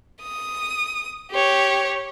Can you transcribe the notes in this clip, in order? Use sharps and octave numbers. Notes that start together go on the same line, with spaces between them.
D#6
G4 C#5